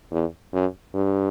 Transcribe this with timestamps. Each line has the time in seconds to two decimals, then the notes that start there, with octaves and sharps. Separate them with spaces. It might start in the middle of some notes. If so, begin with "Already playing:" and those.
0.12 E2
0.53 F#2
0.95 G2